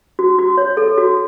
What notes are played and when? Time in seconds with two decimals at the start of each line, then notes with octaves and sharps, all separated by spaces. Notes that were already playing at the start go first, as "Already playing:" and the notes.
0.19 F#4
0.39 F#4
0.58 C#5
0.77 A4
0.98 F#4